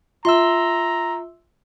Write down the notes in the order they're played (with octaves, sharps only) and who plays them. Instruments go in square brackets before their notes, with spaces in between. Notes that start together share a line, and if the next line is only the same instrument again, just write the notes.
[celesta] F4 E5 [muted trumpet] A#5 [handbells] C6 E6